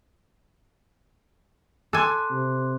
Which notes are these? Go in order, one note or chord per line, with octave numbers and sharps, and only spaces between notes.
A4 G#5 C6 D6 F#6
C3